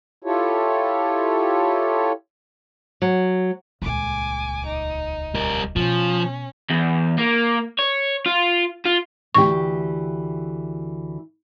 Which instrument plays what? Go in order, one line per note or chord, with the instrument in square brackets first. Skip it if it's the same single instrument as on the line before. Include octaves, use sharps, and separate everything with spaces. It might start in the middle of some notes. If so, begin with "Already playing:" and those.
[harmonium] E4 F4 G4 A4 C#5
[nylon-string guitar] F#3
[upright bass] D#1 C#2 [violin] G#5 D6
[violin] D#4
[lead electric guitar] G3 A#4
[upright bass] B2 [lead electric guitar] F3 [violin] C#4
[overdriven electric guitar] E2
A#3
C#5
F4
F4
[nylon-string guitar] D2 E3 G4 [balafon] C#6